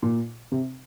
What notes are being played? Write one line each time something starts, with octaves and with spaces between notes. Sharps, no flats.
A#2
C3